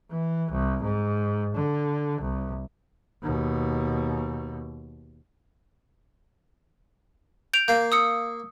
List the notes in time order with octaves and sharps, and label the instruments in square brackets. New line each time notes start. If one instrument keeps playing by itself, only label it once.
[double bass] E3
C2
G#2
D3
C2
D#2 B2
[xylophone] G6 D7 F7
[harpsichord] A#3 F5 [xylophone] G6
[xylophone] D#6 E6 C#7